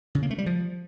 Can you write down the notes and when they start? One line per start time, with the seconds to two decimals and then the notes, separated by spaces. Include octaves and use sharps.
0.15 C#3
0.23 A#3
0.31 A3
0.38 G3
0.46 F3